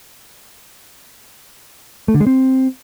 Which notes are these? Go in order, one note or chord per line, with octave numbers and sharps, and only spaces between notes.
A3
D3
G#3
C4